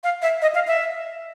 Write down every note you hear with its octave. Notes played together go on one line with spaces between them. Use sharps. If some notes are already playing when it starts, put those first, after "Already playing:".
F5
E5
D#5
F5
E5